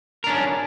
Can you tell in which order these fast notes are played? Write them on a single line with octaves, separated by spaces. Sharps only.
A#4 D4 C#4